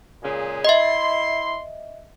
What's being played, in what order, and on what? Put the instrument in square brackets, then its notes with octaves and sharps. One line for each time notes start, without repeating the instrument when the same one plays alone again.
[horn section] A#2 C#3 G#3
[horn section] E4 C6 [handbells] D#5 E5